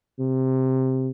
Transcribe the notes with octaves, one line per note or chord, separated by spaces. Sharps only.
C3